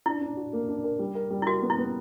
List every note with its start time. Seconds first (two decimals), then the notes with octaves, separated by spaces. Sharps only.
0.06 D4 E4
0.21 D4
0.37 F#4
0.53 A#3
0.68 D4
0.84 A#4
0.99 G3
1.15 A#4
1.30 G3
1.42 E4
1.46 F#4 A#4
1.62 B3
1.70 E4
1.78 B3